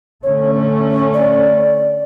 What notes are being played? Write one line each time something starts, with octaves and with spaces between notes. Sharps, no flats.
D3 A3 C#4 C#5
D5